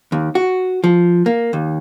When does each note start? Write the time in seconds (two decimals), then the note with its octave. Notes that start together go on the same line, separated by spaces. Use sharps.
0.12 D#2
0.35 F#4
0.84 F3
1.26 A#3
1.53 D#2